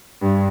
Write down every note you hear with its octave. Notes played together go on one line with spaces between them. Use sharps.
G2